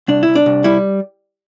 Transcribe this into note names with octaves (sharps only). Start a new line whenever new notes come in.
C2 D4
E4
C2
D4
C2
G3 E4